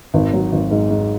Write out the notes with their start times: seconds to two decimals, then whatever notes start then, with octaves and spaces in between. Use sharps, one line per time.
0.14 G#1
0.33 F#3
0.52 G#1
0.71 G#2
0.91 G#2